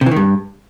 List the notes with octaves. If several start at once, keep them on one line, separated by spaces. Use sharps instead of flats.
C3
E3
D#3
G2